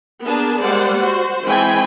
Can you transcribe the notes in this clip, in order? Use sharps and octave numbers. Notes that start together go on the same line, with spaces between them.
B3 D4 G#4 A#4 A5
G3 G#3 A#3 C5 D5 F#5
F#4 C5
E3 G#3 C4 G5 G#5 B5